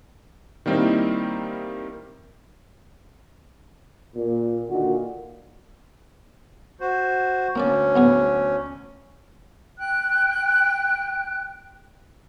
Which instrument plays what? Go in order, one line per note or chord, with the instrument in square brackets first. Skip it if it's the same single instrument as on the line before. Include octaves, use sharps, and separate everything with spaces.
[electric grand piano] D#3 G3 A#3 C4 D#4 E4
[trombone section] A#2
A#2 D3 D#3 F#4
[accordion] F#4 C5
[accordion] D2 C#4 [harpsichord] A#3 D4 D5
[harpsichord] B1 B3 G#4
[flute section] G5 F#6